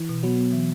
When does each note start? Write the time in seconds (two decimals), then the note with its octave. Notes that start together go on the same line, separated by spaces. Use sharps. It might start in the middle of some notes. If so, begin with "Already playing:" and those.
Already playing: E3
0.09 B2
0.23 F#3 B3
0.38 B3
0.52 E3